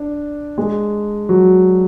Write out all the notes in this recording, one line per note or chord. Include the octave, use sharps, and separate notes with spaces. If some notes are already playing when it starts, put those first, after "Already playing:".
Already playing: D4
G#3
F#3